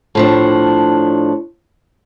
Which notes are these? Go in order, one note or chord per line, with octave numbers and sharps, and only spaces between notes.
A2 F3 D4